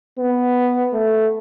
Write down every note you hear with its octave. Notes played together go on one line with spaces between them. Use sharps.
B3
A3